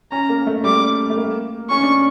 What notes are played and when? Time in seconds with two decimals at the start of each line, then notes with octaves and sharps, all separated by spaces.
0.12 C#4 A#5
0.29 A#3
0.47 A3
0.64 G3 D6
1.10 A3
1.17 A#3
1.70 C#4 C#6
1.83 D4